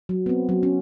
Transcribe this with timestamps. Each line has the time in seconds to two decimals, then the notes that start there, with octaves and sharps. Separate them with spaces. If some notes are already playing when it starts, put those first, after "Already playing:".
0.09 F#3
0.26 B3 C4
0.49 F#3
0.63 C#4